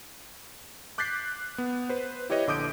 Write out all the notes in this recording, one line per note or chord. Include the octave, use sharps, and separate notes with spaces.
D6 F#6 G6 A6 B6 C7
B3
B4 C5
E4 G4 B4 C#5 D#5
A#1 D3 D6 D#6 G6 D7